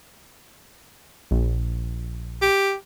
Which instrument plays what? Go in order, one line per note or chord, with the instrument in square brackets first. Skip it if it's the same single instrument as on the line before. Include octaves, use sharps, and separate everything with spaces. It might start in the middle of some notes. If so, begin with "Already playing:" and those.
[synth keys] A#1
[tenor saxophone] G4